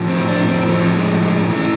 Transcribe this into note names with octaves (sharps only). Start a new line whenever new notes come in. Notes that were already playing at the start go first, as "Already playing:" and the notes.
Already playing: A2 F3
C4
D4
C4
A2 F3 A3
G#3
G#3
A2 E3 A3